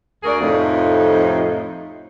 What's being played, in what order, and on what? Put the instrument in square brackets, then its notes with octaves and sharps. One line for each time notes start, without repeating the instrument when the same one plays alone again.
[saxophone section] D2 F#4 G#4 A#4 D5
F2 A2 C3 F3 D#4